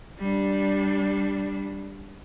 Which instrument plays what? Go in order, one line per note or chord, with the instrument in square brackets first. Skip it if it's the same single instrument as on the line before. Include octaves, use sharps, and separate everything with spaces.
[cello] G3 D4